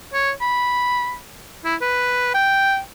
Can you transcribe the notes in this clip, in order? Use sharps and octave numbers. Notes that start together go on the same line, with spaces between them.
C#5
B5
E4
B4
G5